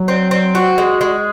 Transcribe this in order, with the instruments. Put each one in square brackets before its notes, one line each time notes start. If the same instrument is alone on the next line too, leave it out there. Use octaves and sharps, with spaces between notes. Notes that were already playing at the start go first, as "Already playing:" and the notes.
Already playing: [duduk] F#3
[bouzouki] C4
C4
F#4
G#3
G#3